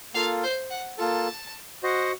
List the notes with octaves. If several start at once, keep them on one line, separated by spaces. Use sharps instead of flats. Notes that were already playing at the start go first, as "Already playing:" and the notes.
A#3 F4 A4 F5
C5
F#5
A#3 F4 A4 A5
F#4 C5 D#5 F#5